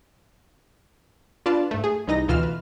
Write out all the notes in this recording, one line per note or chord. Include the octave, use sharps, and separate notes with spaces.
D4 F4 B4 D5 F5 A5
G#2 A3
G#4
C2 E3 D#4 D#5 A#6
D2 B2 E3 F4 F6 E7
B4